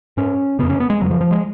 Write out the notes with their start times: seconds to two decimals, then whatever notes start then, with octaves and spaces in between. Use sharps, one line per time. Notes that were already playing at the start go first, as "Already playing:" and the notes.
0.17 G#2 C#4
0.59 F2 C#3 B3
0.70 C#4
0.80 B3
0.90 G#3
1.00 F2 C#3 F#3
1.11 F3
1.21 F3
1.31 G#3